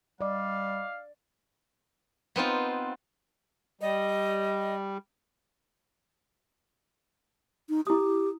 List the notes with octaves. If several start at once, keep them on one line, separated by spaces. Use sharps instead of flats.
G3 D5 D#5 F5 D6
B3 C4 D#4 F4
G3 D#5
D#4
E4 G4 D#6